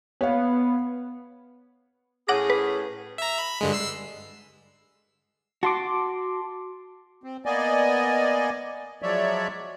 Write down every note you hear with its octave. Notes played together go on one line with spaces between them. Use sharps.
B3 C#5 F5
A2 C#4 G#4 F#5 D6 A#6
B4
E5 A#5
B5
G2 D3 G#3
E6 C7
F#4 A5 C6 D6
C4
A#3 B3 D5 D#5 G#5
F3 F#3 G#3 C#5 D5 E5